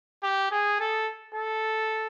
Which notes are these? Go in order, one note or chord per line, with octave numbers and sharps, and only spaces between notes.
G4
G#4
A4
A4